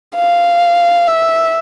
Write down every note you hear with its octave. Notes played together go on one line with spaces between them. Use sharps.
F5
E5